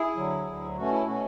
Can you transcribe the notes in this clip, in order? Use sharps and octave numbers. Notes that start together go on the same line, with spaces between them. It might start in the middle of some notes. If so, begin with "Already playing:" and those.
Already playing: E4 G#4
D2 D3 F#3
D2 D3 F#3
B2 A3 C#4 F#4
E4
B2 A3 C#4 F#4